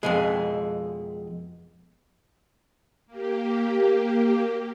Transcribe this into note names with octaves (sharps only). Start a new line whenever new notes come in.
F2 B2 G#3
A#3 G4